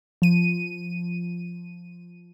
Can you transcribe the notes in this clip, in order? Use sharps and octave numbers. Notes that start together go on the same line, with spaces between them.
F3 D#7